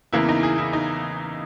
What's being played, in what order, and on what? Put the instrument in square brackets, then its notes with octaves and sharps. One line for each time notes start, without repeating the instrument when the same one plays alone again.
[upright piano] E2 C#3 E3 A#3 E4
D#4
G#4
E4
D#4